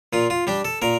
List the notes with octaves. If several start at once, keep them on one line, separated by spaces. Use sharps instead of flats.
A#2 F4
F4
G3 D4 G4
A4
A#2 A#4